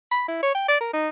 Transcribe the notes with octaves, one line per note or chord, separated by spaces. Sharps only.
B5
E4
C#5
G5
D5
A#4
D#4